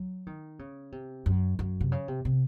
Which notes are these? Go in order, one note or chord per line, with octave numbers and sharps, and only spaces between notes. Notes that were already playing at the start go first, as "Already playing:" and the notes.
Already playing: F#3
D#3
C#3
C3
F#2
F#2
C3
C#3
C3
C3